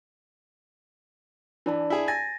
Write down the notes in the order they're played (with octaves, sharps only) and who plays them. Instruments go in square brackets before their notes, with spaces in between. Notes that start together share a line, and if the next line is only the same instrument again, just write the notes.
[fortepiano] E3 [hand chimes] D4 D5 A5
[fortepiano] E4 G#4
[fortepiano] G#5 [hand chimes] A6 A#6